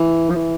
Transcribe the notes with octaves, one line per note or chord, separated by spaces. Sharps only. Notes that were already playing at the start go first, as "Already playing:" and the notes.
Already playing: E3
F3
E3